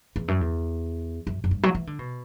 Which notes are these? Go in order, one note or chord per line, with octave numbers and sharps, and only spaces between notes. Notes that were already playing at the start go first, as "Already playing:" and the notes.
E2
F#2
E2
F#2
F#2
G2
F#3
E3
D3
B2